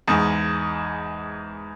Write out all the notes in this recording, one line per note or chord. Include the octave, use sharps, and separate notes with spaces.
E2 G#2